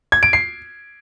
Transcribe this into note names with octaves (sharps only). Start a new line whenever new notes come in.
G#6
D7
C7